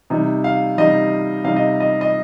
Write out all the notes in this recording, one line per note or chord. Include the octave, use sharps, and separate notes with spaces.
C3 G3 D#4
F5
C3 G3 D#4 D#5
C3 G3 D#4 F5
D#5
D#5
D#5